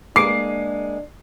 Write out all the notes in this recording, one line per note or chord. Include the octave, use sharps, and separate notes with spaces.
G#3 A#3 D4 D6 C7